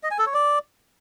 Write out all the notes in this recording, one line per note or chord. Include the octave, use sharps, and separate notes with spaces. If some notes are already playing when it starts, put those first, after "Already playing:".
D#5
G#5
A4
C#5
D5